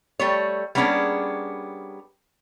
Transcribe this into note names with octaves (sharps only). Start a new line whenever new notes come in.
G3 A3 C#5
G3 A#3 B3 C#4 D4 G#4